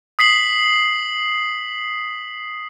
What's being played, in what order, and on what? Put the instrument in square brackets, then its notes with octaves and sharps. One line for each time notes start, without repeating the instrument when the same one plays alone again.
[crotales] D#6 B6 C7 F#7